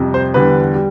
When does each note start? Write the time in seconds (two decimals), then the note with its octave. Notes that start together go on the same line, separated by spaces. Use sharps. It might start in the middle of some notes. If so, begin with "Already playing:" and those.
Already playing: F2 C3 G3
0.14 C5
0.34 E2 D3 G3 B4
0.75 G3